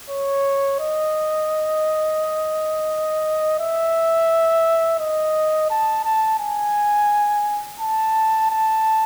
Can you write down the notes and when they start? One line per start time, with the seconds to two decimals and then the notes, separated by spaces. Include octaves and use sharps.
0.10 C#5
0.80 D#5
3.59 E5
4.99 D#5
5.70 A5
6.05 A5
6.39 G#5
7.80 A5
8.50 A5